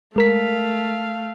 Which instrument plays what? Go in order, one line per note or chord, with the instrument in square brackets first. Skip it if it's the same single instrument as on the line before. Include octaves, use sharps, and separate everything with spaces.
[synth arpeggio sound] G#3 A#4 B6 [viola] A3 F5